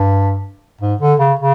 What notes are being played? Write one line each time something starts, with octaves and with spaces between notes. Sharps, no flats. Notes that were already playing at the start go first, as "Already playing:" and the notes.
Already playing: G2
G#2
D3
C#3
C#3